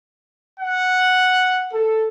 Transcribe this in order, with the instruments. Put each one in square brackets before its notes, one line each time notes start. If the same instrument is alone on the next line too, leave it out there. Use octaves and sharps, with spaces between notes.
[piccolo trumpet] F#5
[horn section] A4